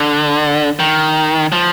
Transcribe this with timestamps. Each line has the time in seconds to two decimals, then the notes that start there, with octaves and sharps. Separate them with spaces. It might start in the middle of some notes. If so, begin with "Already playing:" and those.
Already playing: D3
0.79 D#3
1.52 F3